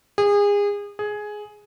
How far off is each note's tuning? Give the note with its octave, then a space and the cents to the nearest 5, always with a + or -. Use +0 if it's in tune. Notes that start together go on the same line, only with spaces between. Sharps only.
G#4 -30
G#4 +10